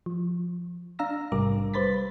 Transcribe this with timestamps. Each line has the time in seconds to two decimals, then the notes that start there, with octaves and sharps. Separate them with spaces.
0.06 F3
0.99 D4 F5 A#5 E6 A#6
1.32 A#1 G#2 C3 G3 A#4 D6
1.74 G3 B4 C5 B5 A6 B6